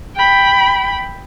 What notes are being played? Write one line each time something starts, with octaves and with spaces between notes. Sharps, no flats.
G5 B5